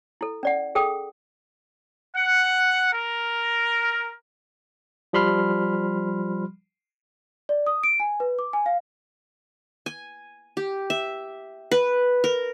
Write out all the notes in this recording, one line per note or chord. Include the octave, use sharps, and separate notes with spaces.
E4 A4
C#4 D5 F#5
G#4 A4 G5 D#6
F#5
A#4
F3 G3 B5 C6 F6
D5
D#6
D7
G#5
B4
D6
G#5
F5
G#5
G4
E5
B4
A#4